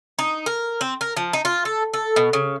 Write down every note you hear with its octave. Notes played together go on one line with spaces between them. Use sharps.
D#4
A#4
C4
A#4
F3
D#4
F4
A4
A4
B2
C#3